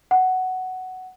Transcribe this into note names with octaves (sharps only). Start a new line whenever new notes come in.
F#5